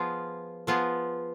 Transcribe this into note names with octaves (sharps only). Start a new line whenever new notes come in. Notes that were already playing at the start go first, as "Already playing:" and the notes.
Already playing: F3 B3 F4 G#4
F3 B3 F4 G#4